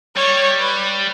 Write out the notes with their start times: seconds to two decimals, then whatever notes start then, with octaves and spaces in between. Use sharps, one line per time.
0.16 G3 C#5
0.59 B4